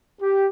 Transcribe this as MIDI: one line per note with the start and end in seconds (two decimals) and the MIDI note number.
0.21 0.47 67